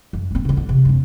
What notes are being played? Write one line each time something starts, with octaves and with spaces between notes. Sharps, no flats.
F#2
G#1 C4
C#3 E4
D3
C3
E1 F#2